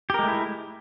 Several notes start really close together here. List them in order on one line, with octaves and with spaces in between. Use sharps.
G4 A#4 G#3 A3 E4